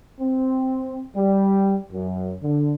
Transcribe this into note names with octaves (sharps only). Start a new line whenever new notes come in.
C4
G3
F#2
D3